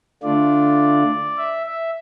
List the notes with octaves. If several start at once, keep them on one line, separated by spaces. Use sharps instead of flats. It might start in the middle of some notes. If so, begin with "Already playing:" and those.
D3 A3 D4 F4 D5
E5
E5